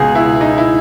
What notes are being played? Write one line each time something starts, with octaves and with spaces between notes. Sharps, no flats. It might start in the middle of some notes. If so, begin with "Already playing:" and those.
Already playing: C#2 B2 G#4
E4
D#4
E4